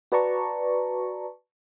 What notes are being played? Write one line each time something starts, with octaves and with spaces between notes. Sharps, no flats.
F#4 B4 D5 A5 A#5 C#6